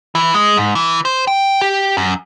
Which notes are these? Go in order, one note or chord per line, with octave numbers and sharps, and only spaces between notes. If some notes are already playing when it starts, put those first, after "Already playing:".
E3
G#3
G#2
E3
C5
G5
G4
F#2